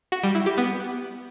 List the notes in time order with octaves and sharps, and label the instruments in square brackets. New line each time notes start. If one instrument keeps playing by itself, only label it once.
[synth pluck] F#4
G3
E4
G4
B3